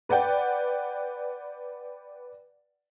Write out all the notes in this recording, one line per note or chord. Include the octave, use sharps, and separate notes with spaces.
B4 D5 F#5 G5